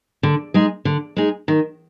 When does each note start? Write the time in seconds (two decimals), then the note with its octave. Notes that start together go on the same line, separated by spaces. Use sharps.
0.23 D3
0.54 G#3 D#4 G#4
0.85 D3
1.16 G#3 D#4 G#4
1.48 D#3